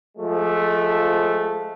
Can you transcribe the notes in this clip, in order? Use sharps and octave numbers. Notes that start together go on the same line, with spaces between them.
F3 G#3 A3